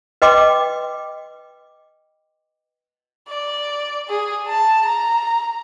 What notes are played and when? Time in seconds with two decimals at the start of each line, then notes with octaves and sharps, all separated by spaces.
0.22 B4 D#5 G5 C6 D6
3.28 D5
4.08 G#4
4.48 A5
4.85 A#5